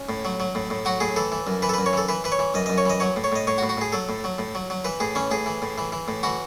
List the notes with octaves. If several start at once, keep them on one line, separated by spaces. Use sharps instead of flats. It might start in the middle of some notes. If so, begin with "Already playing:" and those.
Already playing: C#4
A2
F#3
F#3
A2
A2
F#3 F#4
A2 G#4
E3 A4
E3
F#2
E3 B4
A4
F#2 B4
C#5
E3 A4
E3 B4
E3 B4
C#5
E3
F#2 D#5
F#2 D#5
C#5
E3 D#5
F#3 C#5
A2
C#5
A2 D#5
A2 C#5
F#4
A2
F#4
A2 G#4
F#3 A4
A2
F#3
A2
F#3
F#3
E3 B4
A2 G#4
E3 C#4
A2 G#4
E3
A2
E3
E3
A2
E3 F#4